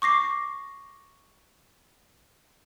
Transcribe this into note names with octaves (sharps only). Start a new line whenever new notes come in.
C#6 D6 A#6 C7